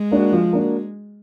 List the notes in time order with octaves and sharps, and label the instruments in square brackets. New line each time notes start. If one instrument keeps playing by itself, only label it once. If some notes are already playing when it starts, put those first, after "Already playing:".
Already playing: [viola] G#3
[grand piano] A#3 D4 F#4
F3
A#3 D4 F#4